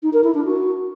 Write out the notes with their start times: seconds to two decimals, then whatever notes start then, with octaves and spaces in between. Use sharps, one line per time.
0.03 D#4
0.13 A#4
0.24 E4
0.34 D4
0.45 F#4